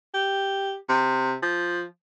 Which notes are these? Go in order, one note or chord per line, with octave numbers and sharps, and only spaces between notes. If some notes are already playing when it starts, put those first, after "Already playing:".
G4
C3
F3